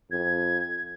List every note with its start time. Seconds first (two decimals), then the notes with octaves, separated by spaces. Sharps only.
0.11 F2 G#6